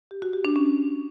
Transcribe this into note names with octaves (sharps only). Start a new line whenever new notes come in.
G4
F#4
G4
D4
C#4